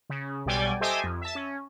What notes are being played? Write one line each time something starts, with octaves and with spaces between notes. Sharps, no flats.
C#3
B1 B2 G3 D5 G5 G#5
G4 A4 C5 D#5 E5 G#5
F2
E5 A5
C#4